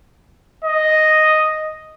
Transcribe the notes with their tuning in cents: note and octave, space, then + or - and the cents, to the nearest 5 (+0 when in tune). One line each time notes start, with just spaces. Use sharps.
D#5 +0